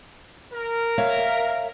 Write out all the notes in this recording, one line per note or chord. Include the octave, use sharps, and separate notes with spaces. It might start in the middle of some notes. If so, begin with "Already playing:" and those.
A#4
C#5 E5 F5